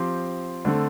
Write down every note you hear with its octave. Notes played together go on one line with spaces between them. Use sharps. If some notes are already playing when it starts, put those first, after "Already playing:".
Already playing: F3 C4 G4 C5
D3 A3 C4 A4